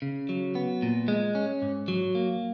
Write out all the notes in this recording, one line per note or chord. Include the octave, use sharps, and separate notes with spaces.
C#3
F#3
B3
A#2
G#3
C#4
G#2
F#3
A#3